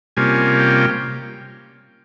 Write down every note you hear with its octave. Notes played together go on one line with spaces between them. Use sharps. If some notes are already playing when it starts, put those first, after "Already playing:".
C3 G3 A#3 C#4 F4 G#5
G5